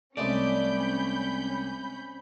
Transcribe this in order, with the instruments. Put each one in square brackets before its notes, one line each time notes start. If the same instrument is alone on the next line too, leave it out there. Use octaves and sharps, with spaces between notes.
[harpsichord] C2 G#3 A3 [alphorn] C4 [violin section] C#4 B5 G6 [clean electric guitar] D5